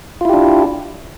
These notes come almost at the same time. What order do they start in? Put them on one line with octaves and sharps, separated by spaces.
F4 E4 G4 D4